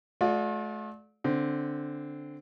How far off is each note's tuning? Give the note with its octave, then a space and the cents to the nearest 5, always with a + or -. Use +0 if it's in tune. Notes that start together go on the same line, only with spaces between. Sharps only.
A3 -35 F4 +45 D5 +0
D3 +0 C4 +0